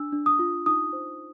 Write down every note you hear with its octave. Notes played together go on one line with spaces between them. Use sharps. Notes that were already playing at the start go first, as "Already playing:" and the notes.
Already playing: D4 E6
D4
D#6
F4
D#4 D#6
C5